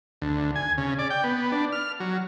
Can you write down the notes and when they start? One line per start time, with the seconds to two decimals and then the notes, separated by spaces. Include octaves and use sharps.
0.22 D2
0.56 G#5
0.78 C#3
0.99 D5
1.10 G5
1.24 B3
1.52 D4
1.72 F6
2.00 F#3